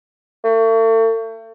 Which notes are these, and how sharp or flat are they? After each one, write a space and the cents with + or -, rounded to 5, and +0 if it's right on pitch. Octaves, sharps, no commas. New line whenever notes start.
A3 +40